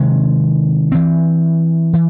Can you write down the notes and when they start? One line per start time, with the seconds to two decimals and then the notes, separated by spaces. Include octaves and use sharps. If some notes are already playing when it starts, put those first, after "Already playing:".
Already playing: C3 D#3 G#3 C4
0.92 E3 C4
1.93 E3